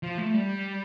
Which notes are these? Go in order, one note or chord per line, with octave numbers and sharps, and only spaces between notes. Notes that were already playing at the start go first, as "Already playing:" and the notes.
F3
A3
G3